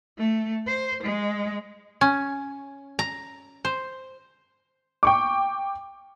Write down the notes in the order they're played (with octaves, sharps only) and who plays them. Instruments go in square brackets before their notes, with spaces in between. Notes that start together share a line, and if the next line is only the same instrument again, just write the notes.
[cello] A3
C5
G#3
[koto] C#4
A#5
C5
[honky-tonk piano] G5 C#6 D6